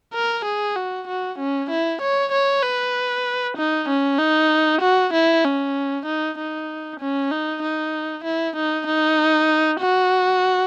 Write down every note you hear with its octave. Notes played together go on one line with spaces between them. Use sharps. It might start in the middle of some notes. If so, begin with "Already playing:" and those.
A#4
G#4
F#4
F#4
C#4
E4
C#5
C#5
B4
D#4
C#4
D#4
F#4
E4
C#4
D#4
D#4
C#4
D#4
D#4
E4
D#4
D#4
F#4